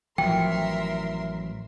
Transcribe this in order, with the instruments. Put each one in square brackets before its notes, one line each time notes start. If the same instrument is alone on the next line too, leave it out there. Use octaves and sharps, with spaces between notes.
[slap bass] A1 A2 F#3 [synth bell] F3 [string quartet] A#4 E5 C6 [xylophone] G5